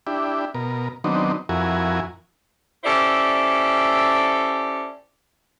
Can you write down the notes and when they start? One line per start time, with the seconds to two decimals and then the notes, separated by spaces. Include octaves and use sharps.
0.07 D4 E4 G4
0.54 B2 A#4
1.04 D#3 F#3 B3 C4 D4 D#4
1.49 F2 E4 F#4 A#4 G#5
2.84 C#4 E4 G4 A4 C5 D5